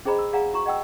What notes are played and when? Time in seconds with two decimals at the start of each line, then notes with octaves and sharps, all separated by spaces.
0.05 C#4 G#4 C5 D#5 A#5 B5
0.19 E6
0.33 G#4 D5 F5 F#5 G#5 A#5
0.54 F#4 A#5 C#6
0.66 D#5 F#5 G5 E6